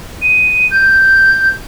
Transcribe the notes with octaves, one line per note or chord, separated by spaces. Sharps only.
D#7
G6